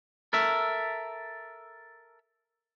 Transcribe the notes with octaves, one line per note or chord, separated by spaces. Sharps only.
A4 A#4 E5